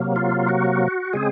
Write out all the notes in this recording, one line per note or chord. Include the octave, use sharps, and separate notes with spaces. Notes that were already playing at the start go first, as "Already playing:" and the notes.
Already playing: C3 F#3 A#3
F4
F#4
C#3 G#3 C4 G#4